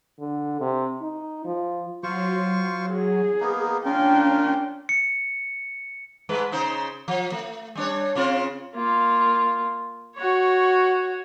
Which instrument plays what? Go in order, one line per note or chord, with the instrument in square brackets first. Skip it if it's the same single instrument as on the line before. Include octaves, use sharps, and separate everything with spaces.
[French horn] D3
C3
D#4
F3
[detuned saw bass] F#3 [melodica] F4 C5 C#6
[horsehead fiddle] G#4
[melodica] A#3 B3 D#4
[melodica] A#3 F4 A#4 [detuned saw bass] C#4 [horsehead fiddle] D4 G5
[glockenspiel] C#7
[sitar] G#2 G#3 B4
C#3 D#4 C5
F3
A3
G3 D4 C#5
C#3 C4 F4
[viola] A#3 F4
F#4 C#5